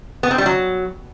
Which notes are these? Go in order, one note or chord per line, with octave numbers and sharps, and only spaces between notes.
B3
C4
G3
F#3